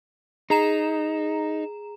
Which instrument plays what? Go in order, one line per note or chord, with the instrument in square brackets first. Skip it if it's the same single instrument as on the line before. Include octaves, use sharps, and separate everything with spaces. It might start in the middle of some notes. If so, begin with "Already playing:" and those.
[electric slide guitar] D#4 [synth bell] G#4 A#5 E7